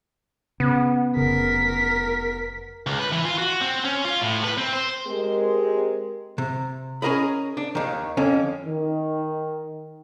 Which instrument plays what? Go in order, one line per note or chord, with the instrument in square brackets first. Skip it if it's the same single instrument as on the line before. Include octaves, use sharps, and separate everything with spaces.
[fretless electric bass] C#3 [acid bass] B3
[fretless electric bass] F1 C#3 [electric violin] A#4 B6
[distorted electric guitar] C#2
B4
E3
F4
F#4
C4
C#4
F4
A2
B4
C4
C5
[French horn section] G#3 C4 G4 A#4
[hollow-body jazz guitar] C3
C#4 G#4 A#4 D#5 B5
D4
D#2 D#3
F2 D3 C#4
[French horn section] D#3